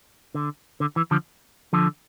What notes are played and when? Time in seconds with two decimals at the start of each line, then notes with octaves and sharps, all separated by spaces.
0.35 D3
0.80 D3
0.96 E3
1.11 D3 F3
1.73 D3 F3